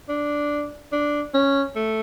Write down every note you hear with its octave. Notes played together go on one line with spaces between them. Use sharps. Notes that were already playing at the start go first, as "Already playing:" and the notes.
D4
D4
C#4
A3